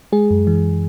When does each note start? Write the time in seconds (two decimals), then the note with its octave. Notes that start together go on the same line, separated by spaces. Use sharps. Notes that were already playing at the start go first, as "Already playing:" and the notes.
0.12 G#3 G#4
0.30 F#2
0.47 E3